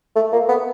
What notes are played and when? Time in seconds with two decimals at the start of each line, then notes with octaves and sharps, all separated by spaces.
0.16 A3
0.33 A#3
0.49 B3